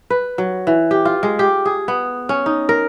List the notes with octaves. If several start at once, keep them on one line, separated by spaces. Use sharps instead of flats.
B4
F#3
E3
G4
F4
G#3
G4
G#4
B3
C#4
D#4
A#4